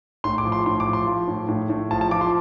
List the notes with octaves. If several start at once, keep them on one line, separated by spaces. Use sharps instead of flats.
A2 C6
D6
F3
C6
A2 C6
D6
F3
C6
F3
A2
A2
A2
F3 A5
A5
F3 D6
C6